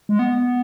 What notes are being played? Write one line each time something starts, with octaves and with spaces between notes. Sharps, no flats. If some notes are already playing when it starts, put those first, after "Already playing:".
G#3
B3